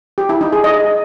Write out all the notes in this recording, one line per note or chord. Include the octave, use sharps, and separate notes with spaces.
G4
E4
D#4
G#4
D#5